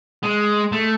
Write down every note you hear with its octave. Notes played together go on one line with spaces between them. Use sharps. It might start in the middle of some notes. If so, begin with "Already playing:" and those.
G#3
A3